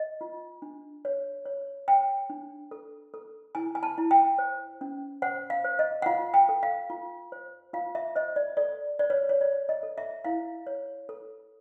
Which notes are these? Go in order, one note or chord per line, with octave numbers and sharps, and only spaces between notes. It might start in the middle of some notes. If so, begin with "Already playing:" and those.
Already playing: D#5
F4
D4
C#5
C#5
C#5 G5
D4
A4
A4
E4 G#5
G#5
A5
E4
G5
C5
C#4
C5 F#5
F5
C5
D#5
F#5
F4 F5
G5
A4
F5
F4
C5
F4 F5
E5
C5 D#5
D5
A4 D5
C5 D5
C#5
C#5
C#5 D5
D#5
A4
E5
E4 F5
C#5
A4